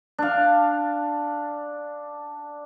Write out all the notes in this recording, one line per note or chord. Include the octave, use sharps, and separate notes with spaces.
D4 F5